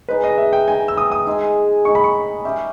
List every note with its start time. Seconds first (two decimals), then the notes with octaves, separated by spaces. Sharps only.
0.08 G#3 D#4 G#4 B4
0.24 D#5
0.38 E5
0.53 G5
0.67 G#3 D#4 G#4 G#5
0.88 E6
0.97 D#6
1.12 D#6
1.27 G#3 D#4 G#4
1.85 G#3 D#4 G#4 C#6
1.95 B5
2.04 C#6
2.45 G3 C#4 G4 B4 E5